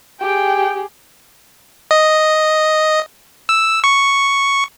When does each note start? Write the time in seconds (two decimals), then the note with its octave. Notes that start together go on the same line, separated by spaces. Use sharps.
0.22 G4 G#4 G5
1.91 D#5
3.49 E6
3.84 C#6